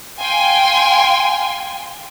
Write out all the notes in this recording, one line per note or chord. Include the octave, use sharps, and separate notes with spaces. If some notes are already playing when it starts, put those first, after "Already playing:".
F5 G5 G#5 C6